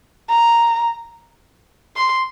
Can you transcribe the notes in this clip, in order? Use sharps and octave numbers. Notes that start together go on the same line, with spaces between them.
A#5
C6